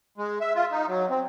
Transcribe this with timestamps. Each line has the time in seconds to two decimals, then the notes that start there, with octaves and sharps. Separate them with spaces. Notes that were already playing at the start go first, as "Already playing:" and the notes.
0.18 G#3
0.41 E5
0.55 F4
0.72 D#4
0.88 F#3
1.10 C4